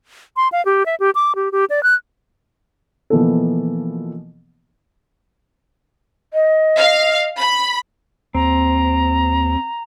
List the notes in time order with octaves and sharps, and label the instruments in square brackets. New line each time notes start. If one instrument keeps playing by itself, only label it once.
[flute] C6
F5
G4
E5
G4
D6
G4
G4
D5
F#6
[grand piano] B2 E3 F3 A#3 B3 A4
[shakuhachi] D#5
[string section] F5
B5
[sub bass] D#2 [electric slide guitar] C4 [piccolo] A#5